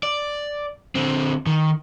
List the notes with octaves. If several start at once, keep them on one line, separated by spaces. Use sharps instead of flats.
D5
D3 C4
D#3